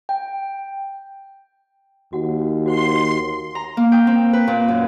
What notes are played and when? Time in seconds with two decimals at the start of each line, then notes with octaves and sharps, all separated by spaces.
0.09 G5
2.13 D#2 F#4 F#5
2.66 F#4 C5 F#5 C6
3.55 A#5
3.77 A#3
3.92 G5
4.07 C4
4.33 B4
4.47 A#2
4.68 F#2